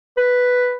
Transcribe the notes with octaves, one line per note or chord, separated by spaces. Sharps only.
B4